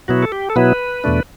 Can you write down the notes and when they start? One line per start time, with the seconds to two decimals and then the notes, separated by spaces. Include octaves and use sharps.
0.08 B2 F#3 B3 E4 F#4
0.23 A4
0.32 G4
0.50 A4
0.56 B2 F#3 B3 E4 B4
1.04 E2 B2 A3 D4